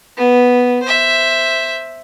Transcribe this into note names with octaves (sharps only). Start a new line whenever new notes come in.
B3
C5 E5